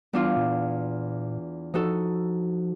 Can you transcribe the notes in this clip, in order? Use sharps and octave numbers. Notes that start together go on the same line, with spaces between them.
E2 G3 D4 F4
A#2
F3 D#4 F#4 A4